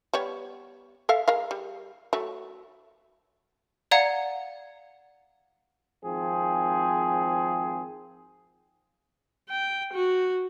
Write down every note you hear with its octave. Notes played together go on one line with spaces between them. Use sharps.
G3 B3 C#5
A4 E5 F5
G#3 A#4 F5
G3
F#3 A3
D5 F5 F#5 A#5 G#6 C#7
G#1 F3 C4 G#4
G5
F#4